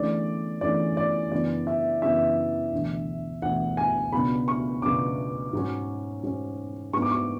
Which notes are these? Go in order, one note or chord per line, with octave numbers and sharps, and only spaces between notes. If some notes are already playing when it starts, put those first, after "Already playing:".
Already playing: E2 D3 A3 C#4 D5
E2 D3 A3 C#4 D5
D5
F#2 C#3 E3 B3 D4 D5
E5
F#2 C#3 E3 B3 D4 E5
E1 D2 D3
E1 D2 D3 F#5
G#5
C#2 B2 F#3 B3 D4 B5
C#6
C#2 B2 F#3 B3 D4 D6
G#2 F#3 C#4
G#2 F#3 C#4
G#2 F#3 B3 D4 C#6
D6
C#6